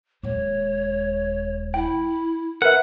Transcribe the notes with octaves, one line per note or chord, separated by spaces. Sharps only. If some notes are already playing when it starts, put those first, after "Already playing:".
D#1 G#3 C#5
E4 G5
A#4 B4 E5 F#5